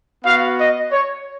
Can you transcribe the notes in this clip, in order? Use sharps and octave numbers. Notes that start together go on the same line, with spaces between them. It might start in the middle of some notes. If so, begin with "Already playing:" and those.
B3 F#4 F5
D#5
C#5